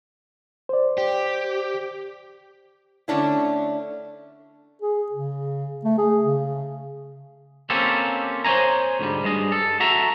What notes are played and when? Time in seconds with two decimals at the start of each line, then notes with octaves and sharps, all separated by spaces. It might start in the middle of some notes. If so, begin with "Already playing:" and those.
0.69 C5 D5
0.98 G4
3.08 D3 A3 C#4 D4 E4
4.82 G#4
5.12 C#3
5.84 A3
5.98 G#4
6.25 C#3
7.70 A#3 C4 C#4 G4 A4
8.45 C5 C#5 D#5 G#5 A#5
8.99 D2 G#2 G3
9.24 G2 G#3 D#5
9.52 A4
9.80 F#4 A4 E5 A#5